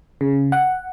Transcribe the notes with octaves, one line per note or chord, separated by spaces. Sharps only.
C#3
F#5